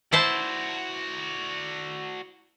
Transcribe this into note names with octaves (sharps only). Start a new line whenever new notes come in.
E4 F#4 C5 D5 A5